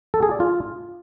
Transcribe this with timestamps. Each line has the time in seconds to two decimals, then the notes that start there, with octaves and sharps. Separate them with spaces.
0.14 A4
0.23 G#4
0.31 D5
0.40 F4